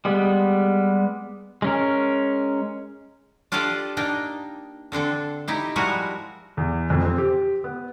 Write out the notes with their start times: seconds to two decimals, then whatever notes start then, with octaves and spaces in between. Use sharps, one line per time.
0.05 G3 G#3 B3
1.62 G#3 C#4 A#4
3.52 D4 F4 G4 A4 D5 D#5
3.97 A#3 D4 D#4 G5
4.92 D3 C4 D4 A4
5.48 D#4 E4 G4
5.76 F3 G3 G#3 E4 F#4 A#4
6.57 E2
6.90 F2
7.05 C4
7.18 G4
7.64 B3